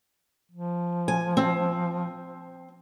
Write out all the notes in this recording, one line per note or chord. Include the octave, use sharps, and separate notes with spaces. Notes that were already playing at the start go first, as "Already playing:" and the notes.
F3
G#5
C4